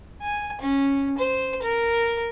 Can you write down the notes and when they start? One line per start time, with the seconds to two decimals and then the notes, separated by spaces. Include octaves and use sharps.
0.22 G#5
0.61 C#4
1.18 C5
1.62 A#4